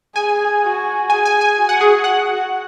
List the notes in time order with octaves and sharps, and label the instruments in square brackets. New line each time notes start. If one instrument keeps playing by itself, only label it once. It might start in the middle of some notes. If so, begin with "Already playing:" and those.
[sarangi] G#4 [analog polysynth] G#5
[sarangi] F#4
[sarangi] G#4 [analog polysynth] G#5
[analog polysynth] G#5
G#5
[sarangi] F#4
[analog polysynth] F#5
G#4
[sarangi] F#4 [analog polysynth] F#5